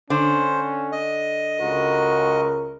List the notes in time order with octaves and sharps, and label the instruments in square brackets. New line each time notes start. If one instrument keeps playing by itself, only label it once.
[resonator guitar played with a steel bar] D3 [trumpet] C#4 [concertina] C5
[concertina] D#5
[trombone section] C#2 A#4 [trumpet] F#4